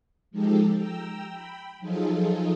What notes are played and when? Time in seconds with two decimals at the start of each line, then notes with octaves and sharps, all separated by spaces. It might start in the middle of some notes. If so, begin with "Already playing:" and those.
0.31 F3 G#3 D#4 G4 A4
0.75 G5 A#5 E6
1.28 G5 B5
1.80 F3 F#3 D#4 F4 G#4 A4